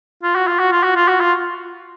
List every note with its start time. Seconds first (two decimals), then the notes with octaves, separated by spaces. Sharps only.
0.23 F4
0.36 F#4
0.47 F4
0.59 F#4
0.72 F4
0.84 F#4
0.96 F4
1.08 F#4
1.20 F4